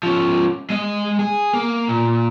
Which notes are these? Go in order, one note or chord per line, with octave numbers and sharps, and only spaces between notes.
F3 C#4
G#3 D#5
G#4
A#3
A#2